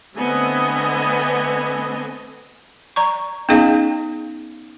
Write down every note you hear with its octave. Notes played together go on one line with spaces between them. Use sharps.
D3 A3 B3 C4 D#5 G#5
D5 A#5 C#6
B3 C#4 D#4 G#4 D#5 F5